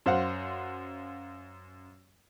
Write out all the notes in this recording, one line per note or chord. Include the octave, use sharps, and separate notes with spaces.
F#2 C5 F5 F#5